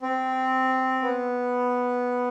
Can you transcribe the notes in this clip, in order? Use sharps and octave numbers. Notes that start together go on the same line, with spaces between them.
C4
B3